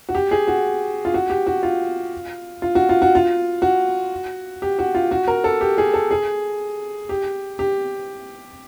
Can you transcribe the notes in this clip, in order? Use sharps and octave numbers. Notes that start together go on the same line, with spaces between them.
F#4
G4
G#4
F#4
F4
F#4
G4
F#4
F4
F4
F#4
F4
F#4
F4
F#4
G4
F#4
F4
F#4
A#4
A4
G4
G#4
A4
G#4
G4
G4